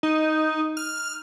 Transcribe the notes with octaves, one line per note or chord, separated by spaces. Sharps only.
D#4
F6